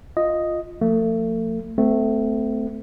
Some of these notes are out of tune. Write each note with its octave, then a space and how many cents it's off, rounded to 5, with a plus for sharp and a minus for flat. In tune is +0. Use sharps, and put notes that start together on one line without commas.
F4 +0 D#5 +0
F3 +0 A3 +35
A3 +0 C4 -35